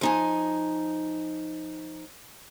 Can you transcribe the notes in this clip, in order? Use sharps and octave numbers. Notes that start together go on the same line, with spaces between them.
F3 D#4 G#5